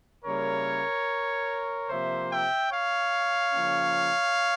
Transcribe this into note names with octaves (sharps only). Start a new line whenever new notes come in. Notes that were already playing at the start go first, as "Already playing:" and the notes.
C#3 G3 A#3 E4 A#4 C#5
C3 F3 A#3 C5 E5
E5 G5
C#5 F5
C#3 F3 A#3 C#4